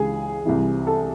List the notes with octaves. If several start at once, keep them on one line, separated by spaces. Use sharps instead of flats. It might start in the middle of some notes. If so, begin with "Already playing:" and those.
Already playing: C#2 C#3 E3 G#4
C2 C3 E3
A4